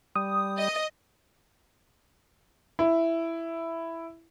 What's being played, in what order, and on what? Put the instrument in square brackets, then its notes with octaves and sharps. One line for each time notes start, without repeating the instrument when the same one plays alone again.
[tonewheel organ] G3 [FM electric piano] D#6
[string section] D#5
[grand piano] E4